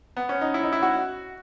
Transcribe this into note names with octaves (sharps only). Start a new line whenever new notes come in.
B3
C#4
D#4
E4
D#4
E4
F#4